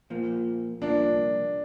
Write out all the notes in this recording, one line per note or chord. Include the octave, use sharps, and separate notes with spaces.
A#2 F3 A#3
C2 A#2 F3 A#3 D4